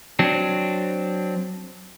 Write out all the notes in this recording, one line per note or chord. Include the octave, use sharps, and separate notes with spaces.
F#3 C4 D4